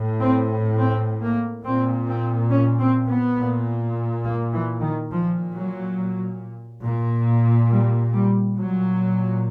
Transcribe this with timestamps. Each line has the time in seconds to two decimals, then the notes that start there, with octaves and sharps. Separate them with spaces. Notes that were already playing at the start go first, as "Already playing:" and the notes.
Already playing: A2
0.20 C4
0.78 C4
1.22 A#3
1.65 A#2 C4
2.07 C4
2.51 C#4
2.80 C4
3.08 B3
3.37 A#2
4.24 A#3
4.53 E3
4.82 D#3
5.11 A#2 F3
5.53 F#3
6.83 A#2
7.71 G3
8.13 G3
8.56 A#2 F#3